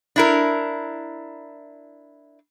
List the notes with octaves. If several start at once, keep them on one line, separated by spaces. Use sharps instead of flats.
D4 E4 A#4